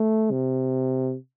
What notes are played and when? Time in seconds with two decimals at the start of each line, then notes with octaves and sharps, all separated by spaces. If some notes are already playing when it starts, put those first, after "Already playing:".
Already playing: A3
0.31 C3